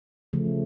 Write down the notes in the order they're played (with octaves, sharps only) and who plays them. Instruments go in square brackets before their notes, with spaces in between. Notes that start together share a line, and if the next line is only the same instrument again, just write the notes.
[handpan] C#3 F3 A3